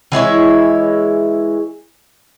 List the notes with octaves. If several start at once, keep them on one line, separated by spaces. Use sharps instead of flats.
E3 G#3 E4 C#5